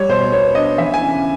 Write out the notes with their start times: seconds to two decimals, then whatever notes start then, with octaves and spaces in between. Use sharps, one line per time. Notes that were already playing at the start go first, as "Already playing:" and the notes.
Already playing: G3 C#5
0.09 B2 C5
0.32 B3 C#5
0.55 D4 D#5
0.78 E3 E5
0.94 G#5
1.01 C#3